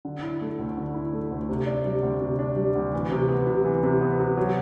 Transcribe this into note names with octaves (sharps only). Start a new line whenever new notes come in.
D3
E4
A3
D2
D3
E4
A3
D2
C3
D4
G3
D2
C3
D4
G3
D2
E3
C3
B3
C3
E3
C3
B3
C3
F#3